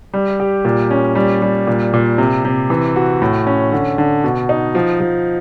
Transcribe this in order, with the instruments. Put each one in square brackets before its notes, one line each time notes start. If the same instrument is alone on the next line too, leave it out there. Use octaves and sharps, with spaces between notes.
[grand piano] G3
G4
A#2
C#4
G3
G3
A#2
A#2
C3
C3
E3
F#4
A2
C#4
D3
D3
B2
D#4
F3
F3